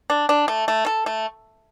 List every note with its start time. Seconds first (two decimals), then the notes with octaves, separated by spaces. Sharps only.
0.10 D4
0.29 D4
0.48 A3
0.68 A3
0.86 A4
1.06 A3